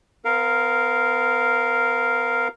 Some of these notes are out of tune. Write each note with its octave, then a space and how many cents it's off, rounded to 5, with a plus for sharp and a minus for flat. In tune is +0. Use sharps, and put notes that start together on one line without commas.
B3 +35 A#4 -5 F5 +0